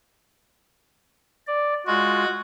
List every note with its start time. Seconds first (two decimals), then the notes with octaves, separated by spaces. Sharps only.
1.47 D5
1.87 G#3 F4 F#4